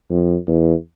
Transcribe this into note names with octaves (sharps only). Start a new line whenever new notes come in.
F2
E2